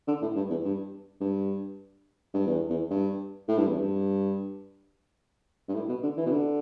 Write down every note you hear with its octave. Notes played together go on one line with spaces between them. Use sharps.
D3
A2
G2
E2
G2
G2
G2
E2
E2
G2
A2
G2
E2
G2
G2
A2
B2
D3
E3
B2
D3